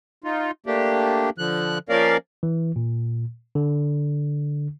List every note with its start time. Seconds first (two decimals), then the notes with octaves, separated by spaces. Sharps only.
0.24 D#4 F4
0.66 A3 A#3 D4 G4
1.38 D3 F3 F#6
1.89 F3 A#3 C#4 A#4 D5 F5
2.43 E3
2.76 A#2
3.55 D3